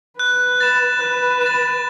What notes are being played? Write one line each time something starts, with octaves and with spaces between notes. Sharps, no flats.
B4 F#6
A6 E7
B4 F#6
A6 E7